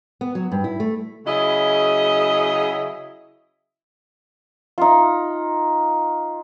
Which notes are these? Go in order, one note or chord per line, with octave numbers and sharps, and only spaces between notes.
B3
F#3
G2
E4
A3
C#3 F#3 E4 G#4 D#5
D#4 F4